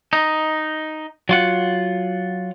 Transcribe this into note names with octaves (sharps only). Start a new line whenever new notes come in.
D#4
F#3 F4 F#5